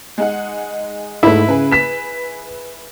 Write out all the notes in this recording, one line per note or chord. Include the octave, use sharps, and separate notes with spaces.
G#3 D#4 F#5
G#2 A3 E4 B4 B5 B6
C#3 G#4 B4
B6 E7